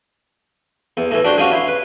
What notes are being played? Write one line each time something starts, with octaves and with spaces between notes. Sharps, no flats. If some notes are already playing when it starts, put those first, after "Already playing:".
E2
A2 E3
D4 F#4 G4 C5
G#3 C#4 F4 F#4
E4 C6
B4